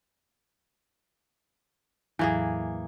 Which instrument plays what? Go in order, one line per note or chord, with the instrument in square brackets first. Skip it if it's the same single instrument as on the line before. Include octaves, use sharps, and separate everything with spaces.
[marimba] E2 A2 F#3 [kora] E3 A#3 G#4